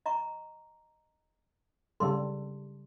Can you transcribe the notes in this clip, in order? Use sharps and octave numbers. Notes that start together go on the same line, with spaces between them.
D#5 A#5 C#6
C#3 G3 A4 C6